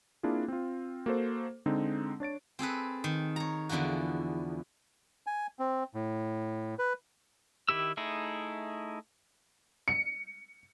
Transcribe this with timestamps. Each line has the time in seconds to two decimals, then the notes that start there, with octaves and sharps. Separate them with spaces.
0.23 A#3 C4 D4 E4 F4 G#4
0.48 C4 F4
1.06 A#3 F#4 A4 C5
1.66 D3 G#3 C4 D#4
2.20 D4 C#5 A6 D7
2.59 C4 G#4 A4 B4
3.04 D#3
3.36 C#5 A#5
3.69 E2 D3 E3 F3 F#4
5.27 G#5
5.59 C4
5.94 A2
6.79 B4
7.69 D#3 E4 G4 E6
7.97 A3 D#4 E4 G#4
9.88 C#7